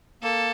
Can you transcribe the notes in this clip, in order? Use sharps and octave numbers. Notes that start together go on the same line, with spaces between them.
A#3 A4